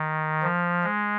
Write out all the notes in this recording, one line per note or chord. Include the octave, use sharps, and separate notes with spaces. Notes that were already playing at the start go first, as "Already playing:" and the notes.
Already playing: D#3
F3
G#3